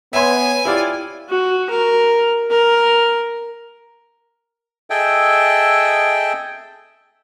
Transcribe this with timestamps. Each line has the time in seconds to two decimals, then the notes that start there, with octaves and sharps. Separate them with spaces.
0.13 B3 C#5 E5 G#5 C6
0.65 E4 F4 G4 D5
1.29 F#4
1.70 A#4
2.50 A#4
4.90 G#4 A4 D#5 E5 G5